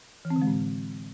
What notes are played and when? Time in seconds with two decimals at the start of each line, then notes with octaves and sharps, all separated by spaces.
0.25 E3
0.30 C4
0.36 D3
0.42 G#3
0.47 A2